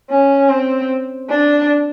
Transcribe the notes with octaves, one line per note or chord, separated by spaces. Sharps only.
C#4
C4
D4